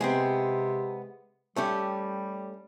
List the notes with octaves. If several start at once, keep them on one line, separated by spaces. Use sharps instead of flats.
C3 G#3 B3 C4
G3 A3 C#4 G4